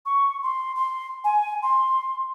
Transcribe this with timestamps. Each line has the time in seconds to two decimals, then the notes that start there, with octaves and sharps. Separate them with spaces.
0.06 C#6
0.43 C6
0.75 C6
1.24 G#5
1.62 C6